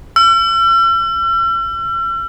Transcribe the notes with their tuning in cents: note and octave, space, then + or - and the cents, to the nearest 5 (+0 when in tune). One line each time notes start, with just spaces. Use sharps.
E6 +45